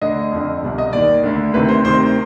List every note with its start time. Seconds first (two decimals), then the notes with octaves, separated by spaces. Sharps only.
0.01 D2 D3 D#5
0.32 F2 D3
0.63 C2 B2
0.78 D#5
0.93 D#2 D#3 D5
1.23 D2 D3
1.53 D2 C3 D#3 B4
1.69 C5
1.84 D2 C3 D#3 C5